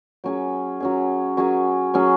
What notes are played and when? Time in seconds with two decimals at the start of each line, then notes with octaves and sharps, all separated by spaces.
0.24 F#3 C#4 G#4
0.80 F#3 C#4 G#4
1.37 F#3 C#4 G#4
1.94 F#3 C#4 G#4